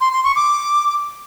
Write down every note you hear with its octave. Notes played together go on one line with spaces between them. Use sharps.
C6
C6
C#6
D6